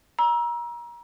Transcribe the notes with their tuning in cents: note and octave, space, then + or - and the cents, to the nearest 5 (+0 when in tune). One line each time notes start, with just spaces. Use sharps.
A#5 +30 E6 +0